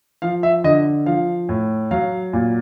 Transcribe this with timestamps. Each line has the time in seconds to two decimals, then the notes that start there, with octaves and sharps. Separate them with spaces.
0.22 F3 F5
0.43 E5
0.64 D3 D#5
1.06 F3 F5
1.49 A2
1.91 F#3 F5
2.33 A#2